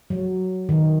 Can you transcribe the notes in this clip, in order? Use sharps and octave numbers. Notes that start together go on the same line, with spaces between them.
F#3
D#3